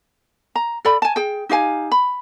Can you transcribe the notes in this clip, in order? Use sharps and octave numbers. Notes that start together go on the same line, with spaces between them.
A#5
A4 D5 B5
G#5 A5
G#4 G5
D#4 G4 F5 G#5
B5